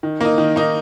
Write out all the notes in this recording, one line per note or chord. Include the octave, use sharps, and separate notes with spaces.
D#3
A#3 D#4
D#3
A#3 D#4